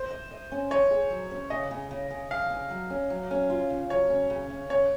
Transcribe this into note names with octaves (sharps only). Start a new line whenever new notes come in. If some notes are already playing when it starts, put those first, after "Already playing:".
Already playing: C5
D#5
D#5
C#4
C#5 D#5
G#4
F#3
C#4
C#3 D#5
C#3
C#3
C#3
C#3 F5
C#3
F#3
C#4
F#3
C#4
F4
C#3
F#3 C#5
C#4
C#3
C#3
C#4 C#5